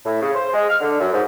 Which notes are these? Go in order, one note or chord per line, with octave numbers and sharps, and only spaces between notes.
A2
C#3
C5
G#3
F6
D3
F#2
G#2